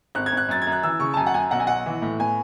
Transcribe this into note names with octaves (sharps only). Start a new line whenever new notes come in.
G#1 F#6
G#6
G#1 F#6
F#2 A6
F#2 G#6
F#6
E3 E6
C#3 C#6
A5
F#2 G#5
F#5
F#2 G#5
B1 F#5
G#5
B1 F#5
E3
A2
B3 G#5